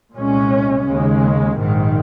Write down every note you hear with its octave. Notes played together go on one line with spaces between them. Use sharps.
C2 A#2 G#3 C#4
D#2 C#3 G#3
A#1 G#2 D#3